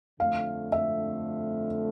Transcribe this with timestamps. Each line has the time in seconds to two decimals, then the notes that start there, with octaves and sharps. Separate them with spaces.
0.20 F2 D3 A3 F5
0.72 E5